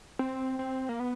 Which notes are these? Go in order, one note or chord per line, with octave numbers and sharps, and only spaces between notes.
C4
C4
A#3
B3